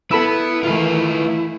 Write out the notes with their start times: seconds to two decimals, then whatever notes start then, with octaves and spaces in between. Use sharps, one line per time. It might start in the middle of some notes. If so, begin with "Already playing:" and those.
0.11 B3 E4 A4 B4 B5 E6
0.63 D#3 E3 A3 F4 B4